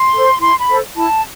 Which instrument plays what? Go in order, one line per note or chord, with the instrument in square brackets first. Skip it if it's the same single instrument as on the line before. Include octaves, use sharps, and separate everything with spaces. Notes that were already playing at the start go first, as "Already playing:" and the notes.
Already playing: [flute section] C6
A4 C5
E4 C6
B5
A4 C5
E4 A5